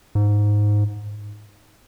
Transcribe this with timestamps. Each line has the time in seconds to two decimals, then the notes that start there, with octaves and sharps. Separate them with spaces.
0.15 G#2